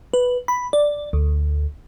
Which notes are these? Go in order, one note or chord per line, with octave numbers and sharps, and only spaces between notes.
B4
B5
D5
D2